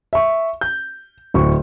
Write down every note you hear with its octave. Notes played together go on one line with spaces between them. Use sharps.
E5 C#6
G6
D1 C#6